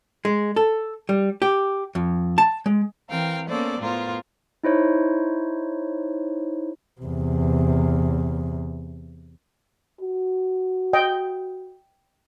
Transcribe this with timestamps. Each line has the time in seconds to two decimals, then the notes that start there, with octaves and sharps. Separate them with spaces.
0.25 G#3
0.56 A4
1.09 G3
1.42 G4
1.95 F2
2.38 A5
2.66 G#3
3.09 E3 C4 A#4 F5 G5
3.48 A#3 B3 C#4 A4 C5 D5
3.80 A2 B3 F4 A#4 C5
4.64 D#4 E4 C5 C#5
7.02 E2 C3
10.01 F#4
10.93 D#5 G5